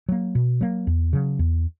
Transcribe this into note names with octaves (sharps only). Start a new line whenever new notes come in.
F#3 A#3
B2
F#3 A#3
E2
C#3 F#3
E2